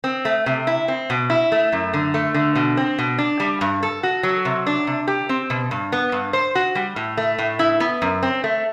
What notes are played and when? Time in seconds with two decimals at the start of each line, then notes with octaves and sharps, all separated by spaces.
0.04 C4
0.25 A3
0.46 C3
0.67 E4
0.88 C4
1.10 B2
1.30 E4
1.52 A3
1.72 F#2
1.94 D3
2.14 A3
2.34 D3
2.56 B2
2.77 C4
2.99 B2
3.18 D4
3.40 G3
3.61 G2
3.83 A4
4.03 F#4
4.23 F#3
4.45 C3
4.67 D4
4.87 C3
5.07 G4
5.29 C4
5.50 B2
5.71 G2
5.92 B3
6.12 G2
6.33 C5
6.55 F#4
6.75 G3
6.96 A2
7.17 A3
7.38 A2
7.59 E4
7.80 B3
8.02 F#2
8.23 C4
8.44 A3